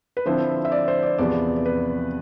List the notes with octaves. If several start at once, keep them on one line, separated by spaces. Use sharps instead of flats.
B4
D3 F3 C4 E4 C5
E5
D5
C5
D5
E2 C3 F3 B3 D5
B4